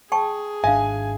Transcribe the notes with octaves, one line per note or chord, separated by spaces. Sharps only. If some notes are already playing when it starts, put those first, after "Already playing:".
G#4 G5 A5 C#6
G#1 D4 E5 F5 G#5